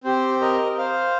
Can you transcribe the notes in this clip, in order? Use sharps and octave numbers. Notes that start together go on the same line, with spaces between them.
C4 G4 C5
A#4 D#5
C5 F5